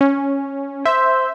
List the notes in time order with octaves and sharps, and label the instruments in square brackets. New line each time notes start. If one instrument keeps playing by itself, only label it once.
[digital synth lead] C#4
[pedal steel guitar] C5 [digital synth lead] E5